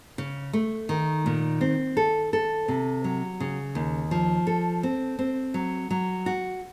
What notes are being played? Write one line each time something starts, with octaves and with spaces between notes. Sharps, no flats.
C#3
A3
D#3
A#2
C4
A4
A4
C3
F#3
C#3
D#2
F3
A4
C4
C4
F#3
F#3
F#4